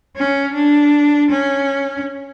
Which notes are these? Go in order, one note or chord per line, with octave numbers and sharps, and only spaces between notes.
C#4
D4
C#4